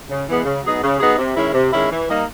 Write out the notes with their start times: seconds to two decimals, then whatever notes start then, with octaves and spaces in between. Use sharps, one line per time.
0.09 C#3
0.27 E3 G#3 B3
0.45 C#3
0.63 F#3 B3 D#4 G#4
0.81 C#3
0.99 F#3 B3 D#4 G#4
1.17 C3
1.36 D#3 G#3 C#4 E4
1.54 C3
1.72 D#3 G#3 C#4 E4
1.91 E3
2.08 G3 A#3 D#4